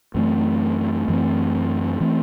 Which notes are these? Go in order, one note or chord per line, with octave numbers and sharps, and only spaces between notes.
F#2 E3 A3 C4
F#2 E3 A3 C4
E3 A3 C4